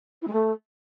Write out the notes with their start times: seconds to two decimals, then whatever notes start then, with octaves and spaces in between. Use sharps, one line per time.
0.22 E4
0.27 G#3
0.33 A3